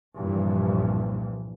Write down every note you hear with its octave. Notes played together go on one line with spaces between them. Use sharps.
C2 G2 A#2 E3 F3